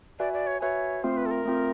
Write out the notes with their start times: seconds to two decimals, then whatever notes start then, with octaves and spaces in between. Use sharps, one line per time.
0.19 F#4 B4 D5 E5 G#5
0.33 D5
0.47 C#5
0.61 F#4 B4 C#5 E5 G#5
1.03 A3 C4 F4 C5
1.17 B4
1.26 A4
1.31 A#4
1.45 A3 C4 F4